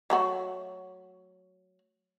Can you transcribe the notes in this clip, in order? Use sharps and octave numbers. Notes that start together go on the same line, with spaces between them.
F#3 A3 F#4